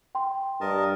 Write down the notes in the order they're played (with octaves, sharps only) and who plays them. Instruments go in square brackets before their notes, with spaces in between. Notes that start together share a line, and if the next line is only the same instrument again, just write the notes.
[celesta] G5 C6
[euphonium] G2 [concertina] A#4 D#5 A5